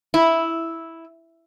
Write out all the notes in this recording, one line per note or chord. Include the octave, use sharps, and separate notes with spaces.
E4